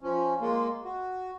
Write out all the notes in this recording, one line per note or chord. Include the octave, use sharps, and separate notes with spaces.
F3 C#4
G#3 A#3 F4
F#4